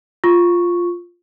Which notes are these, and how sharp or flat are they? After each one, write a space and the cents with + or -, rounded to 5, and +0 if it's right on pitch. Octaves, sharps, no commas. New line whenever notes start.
F4 +0 C#6 +0